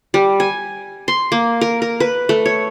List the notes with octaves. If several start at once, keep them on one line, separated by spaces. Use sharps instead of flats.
G3
G#5
C6
A#3
A#4
A#4
B4
A3
C#5